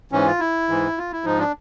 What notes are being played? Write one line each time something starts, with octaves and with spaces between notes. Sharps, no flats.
G#2 E3 C#4
F4
E4
G#2 E3
F4
E4
G#2 F3 D#4
D4